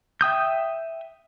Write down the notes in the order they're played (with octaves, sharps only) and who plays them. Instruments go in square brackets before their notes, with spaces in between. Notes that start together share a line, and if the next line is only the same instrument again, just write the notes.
[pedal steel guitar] E5 G5 D#6 G6